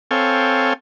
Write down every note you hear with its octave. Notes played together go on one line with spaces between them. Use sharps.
C4 A4 C#5 F5 G5 G#5